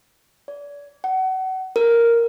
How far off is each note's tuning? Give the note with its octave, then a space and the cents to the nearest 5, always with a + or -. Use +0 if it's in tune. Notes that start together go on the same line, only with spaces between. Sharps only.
D5 -35
F#5 +30
A#4 +0